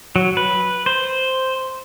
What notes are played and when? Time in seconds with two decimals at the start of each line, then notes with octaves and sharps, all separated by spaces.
0.16 F#3
0.37 B4
0.86 C5